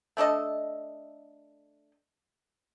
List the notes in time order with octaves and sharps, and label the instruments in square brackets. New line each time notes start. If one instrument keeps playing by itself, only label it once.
[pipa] A3 D4 A4 D#5